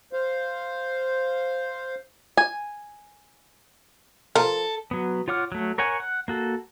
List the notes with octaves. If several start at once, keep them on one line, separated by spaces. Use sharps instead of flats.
C5 F5
G#5
F3 A4 A#4
F#3 B3
F4 C#5 F#5 D6 F6
F#3 A3
A#4 C#5 F#5 G#5
F#5
A#3 F#4 A4